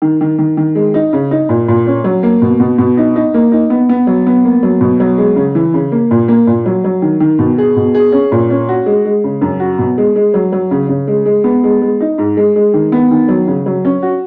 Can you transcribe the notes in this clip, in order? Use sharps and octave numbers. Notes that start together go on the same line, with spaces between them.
D#3
D#3
D#3
D#3
G#3
D#4
C#3
D#4
A#2
A#2
C#4
F#3
A#3
B2
B2
B2
D#4
D#4
A#3
D#4
B3
B3
F#3
B3
A#3
F#3
B2
F#3
G#3
C#3
E3
C#3
A#3
A#2
A#3
A#2
F#3
F#3
D#3
D#3
B2
G#4
B2
G#4
C#4
A#2
C#4
F#4
G#3
G#3
C#3
F#2
F#4
B2
G#3
G#3
F#3
F#3
C#3
C#3
G#3
G#3
B3
G#3
G#3
D#4
G#2
G#3
G#3
D#3
B3
D#3
F#3
C#3
F#3
C#4
F#4